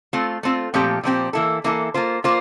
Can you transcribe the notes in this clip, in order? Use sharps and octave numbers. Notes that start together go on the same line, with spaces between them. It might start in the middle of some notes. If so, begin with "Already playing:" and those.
A3 C4 F4
A3 C4 F4
A#2 F3 A3 C4 G4
A#2 F3 A3 C4 G4
E3 A#3 E4 A4
E3 A#3 E4 A4
A#3 F4 C5
A#3 F4 C5